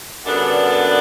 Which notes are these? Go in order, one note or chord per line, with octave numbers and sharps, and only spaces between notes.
F#2 D3 G3 B3 D4